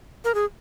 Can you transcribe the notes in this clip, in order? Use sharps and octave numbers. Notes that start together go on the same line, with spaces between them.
A#4
G#4